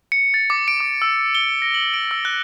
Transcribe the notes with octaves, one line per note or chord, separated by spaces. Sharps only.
C#7
A6
D6
D7
D6
E6
G7
A#6
F#7
D7
E6
F#6